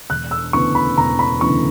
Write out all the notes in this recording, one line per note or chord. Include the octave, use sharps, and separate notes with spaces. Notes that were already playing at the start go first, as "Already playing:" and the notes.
E1 F#6
E6
D2 C#3 E3 B3 C#6
B5
E1 A#5
B5
D2 C#3 E3 B3 C#6